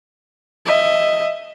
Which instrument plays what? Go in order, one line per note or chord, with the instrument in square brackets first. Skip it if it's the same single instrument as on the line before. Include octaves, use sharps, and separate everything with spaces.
[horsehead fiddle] D#5 E5